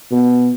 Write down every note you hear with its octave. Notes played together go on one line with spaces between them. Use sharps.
B2